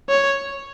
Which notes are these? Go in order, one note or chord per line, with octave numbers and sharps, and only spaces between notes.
C#5